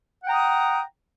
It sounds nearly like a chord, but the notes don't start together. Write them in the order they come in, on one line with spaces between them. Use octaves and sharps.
F#5 G5 A#5 D#6